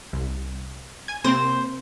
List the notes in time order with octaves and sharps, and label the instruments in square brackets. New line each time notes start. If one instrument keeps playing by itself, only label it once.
[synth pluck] C2
G#5 G#6
[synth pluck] C3 A#3 C4 [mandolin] C5